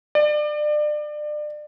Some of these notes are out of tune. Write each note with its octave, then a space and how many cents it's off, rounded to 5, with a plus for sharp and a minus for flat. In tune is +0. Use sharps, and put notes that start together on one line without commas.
D5 +30